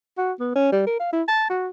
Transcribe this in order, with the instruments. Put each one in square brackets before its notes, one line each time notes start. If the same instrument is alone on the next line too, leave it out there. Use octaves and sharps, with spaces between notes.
[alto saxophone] F#4
B3
C#4
G3
A#4
F5
E4
A5
F#4